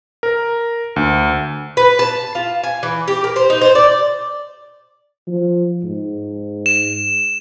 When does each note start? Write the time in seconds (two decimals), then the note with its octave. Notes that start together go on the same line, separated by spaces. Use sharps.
0.23 A#4
0.96 D2
1.77 B4
1.99 A5
2.35 F4
2.64 G#5
2.83 E3
3.08 G4
3.24 A#4
3.36 C5
3.50 D#4
3.61 C5
3.75 D5
5.27 F3
5.84 G#2
6.66 E7